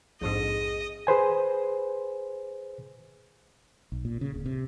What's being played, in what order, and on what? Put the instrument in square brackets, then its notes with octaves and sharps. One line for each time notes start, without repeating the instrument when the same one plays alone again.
[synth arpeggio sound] A#1 F2 G#2 [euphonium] G#4 [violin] D#5
[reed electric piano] G#4 B4 C5 G#5
[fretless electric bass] B1
A#2
C#3
D1
C3